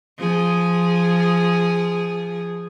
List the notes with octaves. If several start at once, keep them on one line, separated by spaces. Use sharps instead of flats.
F3 G#4